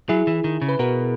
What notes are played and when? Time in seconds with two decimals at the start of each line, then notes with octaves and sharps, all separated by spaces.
0.09 F#3 E4 G#4
0.27 E3
0.44 D#3
0.62 C#3
0.69 B4
0.79 B2 F#4 A#4